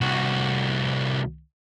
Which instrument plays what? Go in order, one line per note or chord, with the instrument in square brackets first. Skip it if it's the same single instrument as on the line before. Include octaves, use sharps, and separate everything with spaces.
[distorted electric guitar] C2 F#4